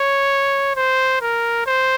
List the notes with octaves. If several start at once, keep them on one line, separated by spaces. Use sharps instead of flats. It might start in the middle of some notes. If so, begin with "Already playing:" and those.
Already playing: C#5
C5
A#4
C5